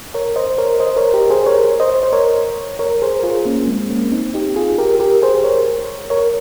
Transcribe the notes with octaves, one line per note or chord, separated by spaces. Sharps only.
A#4 C#5
C5 D#5
A#4 C#5
C5 D#5
A#4 C#5
G4 A#4
G#4 C5
A#4 C#5
C5 D#5
C5
A#4 C#5
A#4 C#5
G#4 C5
A#4
F4 G#4
A#3 C#4
G#3 C4
A#3 C#4
C4 D#4
D#4 G4
F4 G#4
G4 A#4
G4 A#4
G#4 C5
A#4 C#5
A#4 C#5